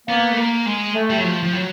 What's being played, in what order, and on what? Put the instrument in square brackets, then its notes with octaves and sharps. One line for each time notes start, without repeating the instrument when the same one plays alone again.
[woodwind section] A#3 [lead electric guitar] B3
[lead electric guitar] A3
A#3
G#3
[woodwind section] A3
[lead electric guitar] G3
F#3
F3
F3
F#3